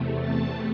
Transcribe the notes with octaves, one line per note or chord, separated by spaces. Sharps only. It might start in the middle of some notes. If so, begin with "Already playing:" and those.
Already playing: E2 C3 A3
A5